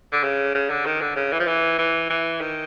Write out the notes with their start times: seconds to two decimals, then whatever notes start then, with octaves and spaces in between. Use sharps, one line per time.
0.12 D3
0.23 C#3
0.55 C#3
0.70 D3
0.86 D#3
1.01 D3
1.16 C#3
1.32 E3
1.39 F3
1.47 E3
1.79 E3
2.10 E3
2.41 D#3